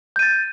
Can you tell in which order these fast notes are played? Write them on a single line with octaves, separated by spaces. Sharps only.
G6 D#7 A6